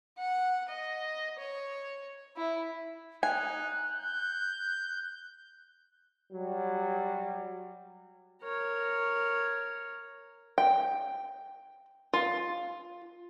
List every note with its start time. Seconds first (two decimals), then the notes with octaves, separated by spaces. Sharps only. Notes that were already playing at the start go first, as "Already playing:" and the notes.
0.18 F#5
0.69 D#5
1.39 C#5
2.36 E4
3.23 D#4 G#5 F#6
3.90 G6
6.32 F#3 G3
8.43 A#4 C#5
10.58 G5
12.13 F4